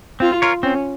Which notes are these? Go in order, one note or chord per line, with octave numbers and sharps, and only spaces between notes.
C4 F4
F4 A#4 C#5
C4 C#4